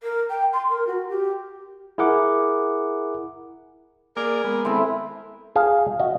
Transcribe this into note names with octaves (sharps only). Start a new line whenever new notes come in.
A#4
G5
C6
A#4
F#4
G4
E4 G#4 A#4 F#5 D6
A#3 G#4 A#4 D5
G#3 B3
C4 E4 A4
G#4 F5
F#4 D#5